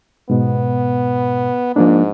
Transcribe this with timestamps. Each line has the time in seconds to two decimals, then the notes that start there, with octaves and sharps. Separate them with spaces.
0.30 G#2 B2 B3
1.76 G#2 F3 A#3 D4